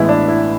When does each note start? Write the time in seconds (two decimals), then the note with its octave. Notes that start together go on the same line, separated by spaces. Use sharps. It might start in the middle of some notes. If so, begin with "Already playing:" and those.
Already playing: A1 A2 E3 G#3 B3 E4
0.09 D4
0.28 E4